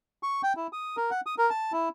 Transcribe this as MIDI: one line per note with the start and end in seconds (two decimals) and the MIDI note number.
0.23 0.42 85
0.43 0.53 79
0.57 0.67 64
0.73 0.96 87
0.97 1.10 70
1.11 1.21 78
1.26 1.35 87
1.38 1.50 70
1.50 1.72 81
1.72 1.89 64